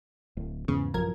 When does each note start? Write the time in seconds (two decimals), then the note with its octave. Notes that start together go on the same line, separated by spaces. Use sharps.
0.37 D1
0.68 E2 G#2 C#3 B3
0.94 A1 F#2 F3 A#4 G#6